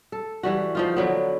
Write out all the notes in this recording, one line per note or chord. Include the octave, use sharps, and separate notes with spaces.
A4
E3 G3 F#4
F3 D#4 F4
D3 F#3 B3